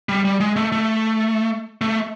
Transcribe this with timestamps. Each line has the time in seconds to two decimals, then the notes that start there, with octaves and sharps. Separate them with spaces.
0.09 G3
0.25 G3
0.40 G#3
0.56 A3
0.72 A3
1.81 A3